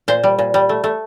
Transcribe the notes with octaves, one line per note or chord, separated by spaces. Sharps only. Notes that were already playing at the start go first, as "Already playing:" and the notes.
A#2 C5
G3
A#2
G3
A3
A3